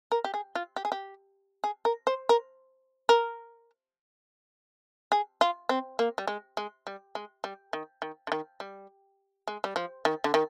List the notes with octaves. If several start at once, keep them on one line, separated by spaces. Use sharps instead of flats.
A#4
G4
G#4
F4
G4
G#4
G4
G#4
A#4
C5
A#4
A#4
G#4
F4
C4
A#3
G3
G#3
G#3
G3
G#3
G3
D#3
D#3
D3
D#3
G3
G#3
G3
F3
D#3
D3
D#3